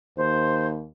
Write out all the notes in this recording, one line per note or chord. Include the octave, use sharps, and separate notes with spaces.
D#2 C5